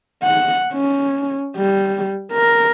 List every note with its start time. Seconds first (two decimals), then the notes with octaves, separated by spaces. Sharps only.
0.23 F#5
0.73 C#4
1.57 G3
2.33 A#4